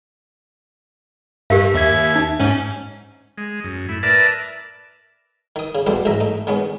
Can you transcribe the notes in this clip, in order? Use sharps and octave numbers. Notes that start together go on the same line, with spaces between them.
G2 G4 A#4 F5
D#2 E5 G#6
D#4
G#2 C#4
G#3
F#2
A2 E4
A#4 B4 D5 E5 A5
D#3 D#6
C#3
B1 B2 G3 A3 G4 C5
A1 G#2 E5 A#5
A3 D#4
D#3 G#3 B3 C#4